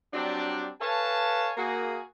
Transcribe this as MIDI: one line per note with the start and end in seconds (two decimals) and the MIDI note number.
0.14 0.69 54
0.14 0.69 55
0.14 0.69 60
0.14 0.69 62
0.81 1.52 69
0.81 1.52 71
0.81 1.52 73
0.81 1.52 77
0.81 1.52 80
0.81 1.52 81
1.57 2.02 58
1.57 2.02 66
1.57 2.02 68